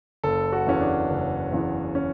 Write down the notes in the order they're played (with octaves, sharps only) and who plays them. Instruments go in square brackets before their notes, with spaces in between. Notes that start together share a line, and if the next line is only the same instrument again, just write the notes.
[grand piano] F#1 A4
F#4
E2 C#3 E3 C#4
D4
F#1
E2 C#3 E3
C#4